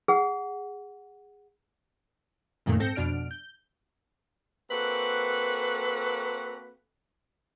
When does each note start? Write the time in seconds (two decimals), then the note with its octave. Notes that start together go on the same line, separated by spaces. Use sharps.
0.08 G#4 F#5
2.66 C#2 F#2 A#2 D#3 A3 A#3
2.80 G#2 C4 A4 G6 A#6 C#7
2.95 F2 B2 D4 F6 D7
3.31 G6
4.71 A#3 C4 F#4 A4 B4